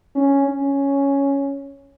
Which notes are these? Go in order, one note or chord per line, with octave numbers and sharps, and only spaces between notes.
C#4
C#4